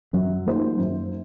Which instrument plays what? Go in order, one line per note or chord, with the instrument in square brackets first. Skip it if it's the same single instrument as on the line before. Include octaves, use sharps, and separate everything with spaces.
[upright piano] F#2 [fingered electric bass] F#3
[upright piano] D#3 A#3 F4 C5
F#2